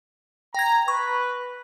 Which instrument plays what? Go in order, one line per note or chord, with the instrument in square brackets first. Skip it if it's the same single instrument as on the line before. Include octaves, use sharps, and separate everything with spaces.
[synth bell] G5 G#6 [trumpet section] A#5
[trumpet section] B4 [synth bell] C#6